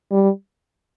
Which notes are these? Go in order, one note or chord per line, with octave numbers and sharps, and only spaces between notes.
G3